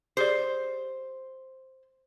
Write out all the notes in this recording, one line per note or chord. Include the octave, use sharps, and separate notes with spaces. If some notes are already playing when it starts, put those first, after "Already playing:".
G4 G#4 C5 D5